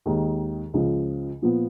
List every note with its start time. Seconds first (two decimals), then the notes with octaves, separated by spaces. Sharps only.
0.06 D#2 D#3 G#3
0.74 C#2 C#3 F3
1.42 A#2 F3 B3